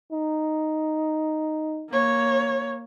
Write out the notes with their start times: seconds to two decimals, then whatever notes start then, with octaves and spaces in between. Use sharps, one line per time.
0.12 D#4
1.90 A#3 C#5